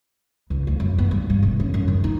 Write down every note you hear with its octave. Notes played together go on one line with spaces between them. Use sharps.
C#2
D2
F#2
B3
G2
G2
E1
C#4
F#2
D#3
D#4